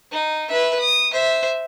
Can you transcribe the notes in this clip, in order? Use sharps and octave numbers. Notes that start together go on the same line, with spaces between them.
D#4
B4 E5
D#6
C5 E5